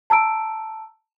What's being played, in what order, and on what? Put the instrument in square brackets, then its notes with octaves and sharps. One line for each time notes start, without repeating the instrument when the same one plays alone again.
[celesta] A5 A#5 E6 D7